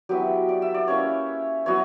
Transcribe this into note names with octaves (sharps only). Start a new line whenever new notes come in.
F#3 B3 E4 G4
D5
E5
D5
A#3 C#4 E4 C#5
F#3 B3 E4 C#5